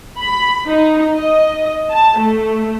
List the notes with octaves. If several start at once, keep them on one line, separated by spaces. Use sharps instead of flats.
B5
D#4
D#5
A5
A3